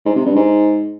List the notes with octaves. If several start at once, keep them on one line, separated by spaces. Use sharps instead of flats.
G#2
C3
G2
G#2